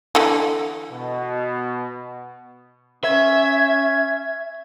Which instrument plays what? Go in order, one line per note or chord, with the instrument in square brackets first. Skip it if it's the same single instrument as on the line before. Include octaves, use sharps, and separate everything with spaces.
[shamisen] D3 E3
[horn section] B2
[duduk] C#4 [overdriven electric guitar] E5 [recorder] G#6